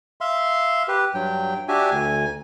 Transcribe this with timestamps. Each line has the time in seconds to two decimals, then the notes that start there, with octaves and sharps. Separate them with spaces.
0.21 E5 F5 C6
0.88 G4 B4
1.14 G2 F#3 G5
1.68 D4 F#4 G4 E5 G#5
1.91 D2 G#5